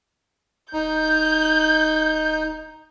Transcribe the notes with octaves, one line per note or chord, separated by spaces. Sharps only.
D1 D#4 G6